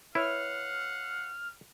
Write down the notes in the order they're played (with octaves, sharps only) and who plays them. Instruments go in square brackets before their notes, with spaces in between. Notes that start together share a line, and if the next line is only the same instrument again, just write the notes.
[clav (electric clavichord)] E4 [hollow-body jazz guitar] B4 C#5 [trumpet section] F5 F#5 [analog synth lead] F6